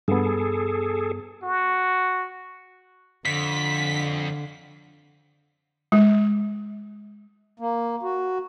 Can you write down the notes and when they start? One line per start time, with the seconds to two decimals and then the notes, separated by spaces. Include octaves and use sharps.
0.08 G2 B3 G#4 A4
1.43 F#4
3.25 F2 D3 B6
5.92 G#3
7.60 A#3
8.03 F#4